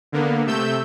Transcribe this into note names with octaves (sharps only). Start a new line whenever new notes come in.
D3 A#3 B3
C3 A3 E6 G6